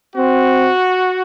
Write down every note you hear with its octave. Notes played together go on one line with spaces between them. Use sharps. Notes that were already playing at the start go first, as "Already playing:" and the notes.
C4 F#4